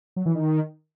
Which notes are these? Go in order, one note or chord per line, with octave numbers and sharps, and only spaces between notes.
F#3
E3
D#3